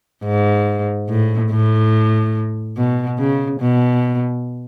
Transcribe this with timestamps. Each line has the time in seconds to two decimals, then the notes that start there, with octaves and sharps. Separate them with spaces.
0.24 G#2
1.09 A2
1.51 A2
2.77 B2
3.19 C#3
3.60 B2